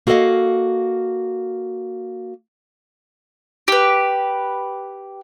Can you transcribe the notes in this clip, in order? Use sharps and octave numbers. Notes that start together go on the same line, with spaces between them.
A#3 F#4 A4 C#5 D#5 F5
G4 B4